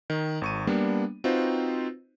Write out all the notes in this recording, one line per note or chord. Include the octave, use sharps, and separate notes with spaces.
D#3
G#1 C#6 D#7
G3 A#3 B3 D4
C4 D#4 F4 F#4 B4 C5